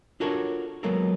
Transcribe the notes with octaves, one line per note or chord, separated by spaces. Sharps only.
D4 F4 F#4 A4 A#4 C#5
F#3 G#3 A#3 B3 A4 A#4